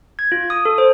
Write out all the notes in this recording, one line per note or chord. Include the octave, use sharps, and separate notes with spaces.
G#6
F4
D#6
A4
C5